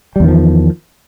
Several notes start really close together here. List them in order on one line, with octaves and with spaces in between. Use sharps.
G3 E2 D#3 F3